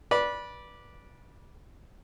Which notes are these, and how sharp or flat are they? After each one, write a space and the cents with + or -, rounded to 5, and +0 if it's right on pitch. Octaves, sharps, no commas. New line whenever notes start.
B4 -20 D5 -5